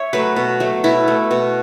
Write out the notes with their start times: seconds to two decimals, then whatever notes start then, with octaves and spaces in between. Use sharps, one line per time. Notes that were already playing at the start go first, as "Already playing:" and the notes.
Already playing: C#5 E5
0.13 F#3 A3 B4
0.36 B2
0.60 F#3 A3
0.84 B2 E4
1.08 A3
1.31 B2